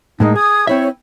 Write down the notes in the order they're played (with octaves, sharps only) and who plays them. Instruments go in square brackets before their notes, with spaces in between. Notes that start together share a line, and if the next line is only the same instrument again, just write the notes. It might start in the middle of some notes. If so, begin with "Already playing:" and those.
[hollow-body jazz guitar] A2 G#3 A#3 [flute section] D#4
[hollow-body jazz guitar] G#4 [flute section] D#6 G#6
[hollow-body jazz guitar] C4 E4 E5 [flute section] C#5